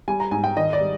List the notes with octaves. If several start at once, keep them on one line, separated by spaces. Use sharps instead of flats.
G3 G#5
A#5
G#2 G#5
G5
D#3 D#5
D5
G3